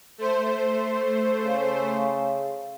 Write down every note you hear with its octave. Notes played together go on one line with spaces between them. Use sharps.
A3 C5
C#3